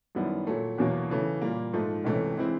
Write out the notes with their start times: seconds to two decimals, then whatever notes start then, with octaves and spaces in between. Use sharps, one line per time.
0.15 F#2 D#3 G3 B3 E4
0.47 A#2 F#3 A3
0.78 E2 B2 F#3 A#3
1.10 C#3 E3 A3
1.42 A#2 G3 A#3
1.73 G#2 F3 A3
2.04 C#2 C3 E3 A3 C#4
2.37 E3 G#3 C4 E4